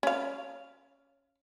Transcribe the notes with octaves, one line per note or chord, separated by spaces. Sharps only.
C#4 F5